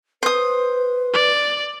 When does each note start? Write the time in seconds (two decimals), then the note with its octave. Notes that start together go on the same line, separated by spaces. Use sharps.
0.23 B4 C5 D#6
1.14 D5